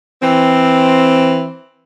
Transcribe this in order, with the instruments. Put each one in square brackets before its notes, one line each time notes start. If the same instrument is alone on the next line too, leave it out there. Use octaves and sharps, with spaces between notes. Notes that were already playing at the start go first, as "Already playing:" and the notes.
[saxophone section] E3 C4